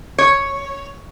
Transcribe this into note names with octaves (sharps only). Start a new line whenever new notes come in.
C#5